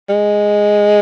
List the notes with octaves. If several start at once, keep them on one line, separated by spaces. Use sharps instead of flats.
G#3